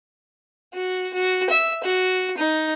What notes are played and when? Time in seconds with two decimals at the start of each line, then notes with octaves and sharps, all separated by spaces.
0.73 F#4
1.13 F#4
1.50 E5
1.84 F#4
2.37 D#4